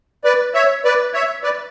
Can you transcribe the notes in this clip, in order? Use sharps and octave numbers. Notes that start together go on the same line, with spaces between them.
B4 D5
C#5 E5
B4 D5
C#5 E5
B4 D5